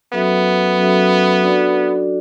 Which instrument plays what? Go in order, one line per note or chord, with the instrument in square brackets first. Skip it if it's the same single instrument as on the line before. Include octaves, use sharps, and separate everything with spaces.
[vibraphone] F#3 C#4 F#4 A4 E5 [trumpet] B3
[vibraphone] F#3 C#4 F#4 A4 E5
D4 F#4 A4 D5